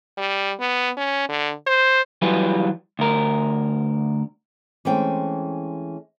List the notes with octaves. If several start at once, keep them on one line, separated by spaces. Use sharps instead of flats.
G3
B3
C#4
D3
C5
E3 F#3 G3 F4 B4
D2 A#4
E3 G#3 A3 C4 C#4 G5